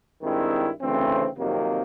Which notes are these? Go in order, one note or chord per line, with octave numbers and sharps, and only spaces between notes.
G2 D#3 G#3 C4 E4
D2 C#3 E3 A3 C4
F2 C3 D#3 F#3 A#3